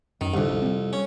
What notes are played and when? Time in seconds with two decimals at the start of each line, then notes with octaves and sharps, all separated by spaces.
0.21 F#2 D#3
0.34 C2 F2 A2 D3 D4
0.49 G#1 D#2
0.62 G3 C4
0.93 C#4